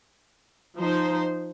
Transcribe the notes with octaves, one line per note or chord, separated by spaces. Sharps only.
F3 D#4 C5